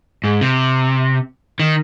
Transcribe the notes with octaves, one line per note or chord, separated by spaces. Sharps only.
G#2
C3
D#3